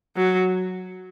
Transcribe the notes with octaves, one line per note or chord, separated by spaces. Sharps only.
F#3